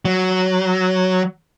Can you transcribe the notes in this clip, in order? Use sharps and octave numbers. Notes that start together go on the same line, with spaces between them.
F#3